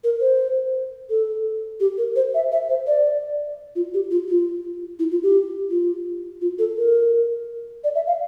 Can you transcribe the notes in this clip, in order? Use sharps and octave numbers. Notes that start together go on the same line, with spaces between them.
A#4
C5
A4
G4
A#4
C5
E5
E5
C5
D5
F4
G4
F4
F4
E4
F4
G4
F4
F4
A4
A#4
D5
E5
F5